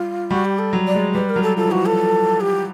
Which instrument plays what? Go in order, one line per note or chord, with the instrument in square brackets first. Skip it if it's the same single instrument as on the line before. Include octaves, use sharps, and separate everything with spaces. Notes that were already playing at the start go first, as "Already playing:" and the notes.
Already playing: [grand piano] G3 [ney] F4
[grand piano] G3 [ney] F#4
[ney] G4
A4
[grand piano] F#3
[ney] D5
[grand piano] G#3
[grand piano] G3 [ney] B4
[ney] A#4
[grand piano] F#3
[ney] A4
[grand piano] F3 [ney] A4
[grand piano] E3
[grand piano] F3 [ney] F#4
[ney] A4
G4